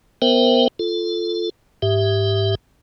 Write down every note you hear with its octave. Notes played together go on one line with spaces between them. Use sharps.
B3 A#4 C5 E5 G5
F4 A4
G#2 G4 E5